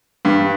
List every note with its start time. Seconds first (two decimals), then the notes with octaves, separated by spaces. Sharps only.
0.25 G2